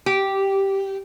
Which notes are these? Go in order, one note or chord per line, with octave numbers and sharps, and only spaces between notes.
G4